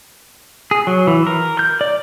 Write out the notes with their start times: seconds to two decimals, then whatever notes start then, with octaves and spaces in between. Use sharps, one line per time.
0.71 G#4
0.87 F#3
1.07 E3
1.27 A#4
1.59 G6
1.81 D5